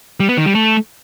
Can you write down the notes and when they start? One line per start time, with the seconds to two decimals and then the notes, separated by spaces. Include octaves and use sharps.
0.20 G3
0.29 B3
0.37 D#3
0.46 G3
0.55 A3